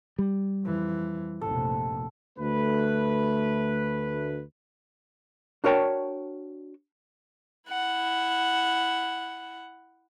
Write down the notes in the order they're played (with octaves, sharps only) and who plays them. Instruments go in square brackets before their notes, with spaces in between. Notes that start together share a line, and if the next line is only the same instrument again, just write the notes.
[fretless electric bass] G3
[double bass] F2 E3
[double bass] F1 A#1 [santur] A4
[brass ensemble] D2 A3 B4
[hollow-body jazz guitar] D4 F#4 A#4 C#5 G5 A5
[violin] E4 F#5